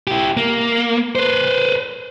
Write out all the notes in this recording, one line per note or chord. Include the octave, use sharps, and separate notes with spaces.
E4 G4
A#3
B4 C5